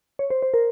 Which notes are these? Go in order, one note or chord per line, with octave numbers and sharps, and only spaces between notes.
C#5
C5
C5
A#4